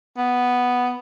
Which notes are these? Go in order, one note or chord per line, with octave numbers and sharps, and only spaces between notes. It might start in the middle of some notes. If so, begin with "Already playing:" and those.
B3